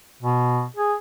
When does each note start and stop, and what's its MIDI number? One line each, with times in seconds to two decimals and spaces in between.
0.22 0.64 47
0.77 0.94 68